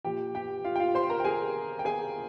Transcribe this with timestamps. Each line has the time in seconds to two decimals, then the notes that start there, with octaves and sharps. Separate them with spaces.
0.04 A#2 F3 G4 G5
0.35 G4 G5
0.64 F4 F5
0.76 G5
0.80 F4 F5
0.95 C5 C6
1.10 A#4 A#5
1.20 G5
1.24 G#4 G#5
1.79 G5
1.85 G#4 G#5